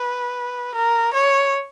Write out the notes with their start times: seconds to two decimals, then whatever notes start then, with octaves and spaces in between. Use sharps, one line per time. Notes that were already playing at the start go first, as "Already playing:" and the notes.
Already playing: B4
0.75 A#4
1.13 C#5